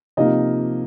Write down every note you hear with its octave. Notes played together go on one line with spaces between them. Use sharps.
C3 F3 A#3 D#4 D#5